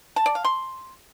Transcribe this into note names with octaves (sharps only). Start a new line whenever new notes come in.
A5
D5
F5
C6